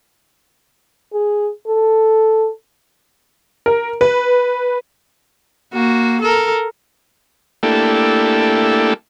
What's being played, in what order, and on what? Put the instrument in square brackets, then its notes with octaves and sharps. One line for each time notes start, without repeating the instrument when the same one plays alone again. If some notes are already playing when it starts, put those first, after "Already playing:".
[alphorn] G#4
A4
[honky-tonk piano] A#4
B4
[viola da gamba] A#3 F#4
A4 A#4
[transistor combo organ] A3 A#3 D4 E4 G4 A4